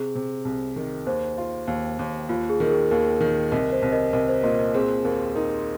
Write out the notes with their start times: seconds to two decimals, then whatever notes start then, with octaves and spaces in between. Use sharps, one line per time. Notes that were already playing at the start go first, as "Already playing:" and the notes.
Already playing: C3 G#4
0.15 C3
0.45 C2
0.76 D#3
1.06 D#2 C5
1.38 F4
1.67 D#2
1.99 D#2
2.29 D#2 F4
2.49 G#4
2.60 D#3
2.66 A#4
2.70 G#4
2.90 D#2 A#4
3.21 D#3
3.52 C2 A#4 D#5
3.72 C5
3.82 C2
3.92 A#4 D#5
4.13 C2 A#4 D#5
4.28 C5
4.43 A#2 A#4 D#5
4.59 A#4 D#5
4.74 C4 G#4
5.04 D#2 A#4
5.35 D#4 A#4 D#5